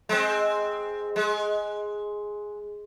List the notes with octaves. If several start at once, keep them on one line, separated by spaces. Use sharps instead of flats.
G#3 C4
G#3